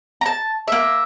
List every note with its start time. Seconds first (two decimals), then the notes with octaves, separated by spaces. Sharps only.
0.21 A5 A#5
0.68 A#3 E5